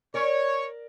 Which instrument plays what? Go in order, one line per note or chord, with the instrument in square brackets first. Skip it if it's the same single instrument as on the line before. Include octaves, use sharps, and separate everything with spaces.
[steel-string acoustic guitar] A#4 D5 [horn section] C#5